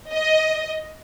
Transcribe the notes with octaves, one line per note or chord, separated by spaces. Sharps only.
D#5